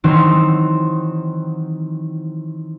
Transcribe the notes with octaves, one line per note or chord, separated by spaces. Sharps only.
D#3 E3 F#3 C4 D#4